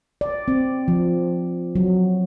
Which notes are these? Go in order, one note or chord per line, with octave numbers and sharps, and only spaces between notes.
D5
C4
F3
F#3